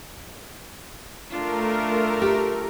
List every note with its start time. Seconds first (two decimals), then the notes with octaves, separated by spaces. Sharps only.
1.30 A3 D4 F4 A#4
2.22 G4